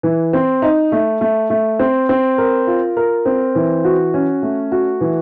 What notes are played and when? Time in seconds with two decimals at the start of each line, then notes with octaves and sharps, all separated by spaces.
0.03 E3
0.33 C4
0.62 D#4
0.92 A3
1.21 A3
1.50 A3
1.79 C4
2.09 C4
2.38 A#4
2.67 F4
2.97 A#4
3.26 C4
3.55 E3
3.84 F#4
4.14 C#4
4.42 A3
4.72 F#4
5.01 E3